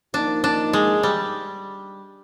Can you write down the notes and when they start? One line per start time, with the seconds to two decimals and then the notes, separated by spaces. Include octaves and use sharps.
0.14 F3 A#3 D4 D#4
0.44 D4
0.73 G#3
1.03 G3